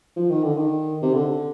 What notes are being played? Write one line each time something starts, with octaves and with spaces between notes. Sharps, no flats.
F3
D#3
D3
D#3
C3
D3